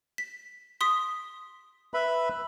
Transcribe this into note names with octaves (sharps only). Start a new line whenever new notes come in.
B6
C6 D#6 B6
B4 E5 B5